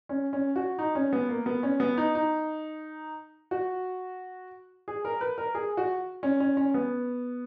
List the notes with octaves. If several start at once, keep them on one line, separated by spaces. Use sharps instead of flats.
C#4
C#4
F#4
D#4
C#4
B3
A#3
B3
C#4
B3
D#4
D#4
F#4
G#4
A#4
B4
A#4
G#4
F#4
C#4
C#4
C#4
B3